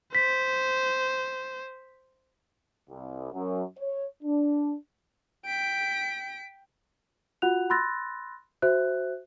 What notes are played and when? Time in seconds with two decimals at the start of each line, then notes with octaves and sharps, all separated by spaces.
0.15 C5 B6
2.89 C2
3.33 F#2
3.77 C#5
4.23 D4
5.46 G5 B6 D7
7.42 F4 F#4 F#5 F#6 F7
7.70 B5 C6 E6 F#6 A6 A#6
8.62 F#4 C5 E5 F#6